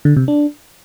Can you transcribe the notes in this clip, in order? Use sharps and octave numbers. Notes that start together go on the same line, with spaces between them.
D3
C3
D4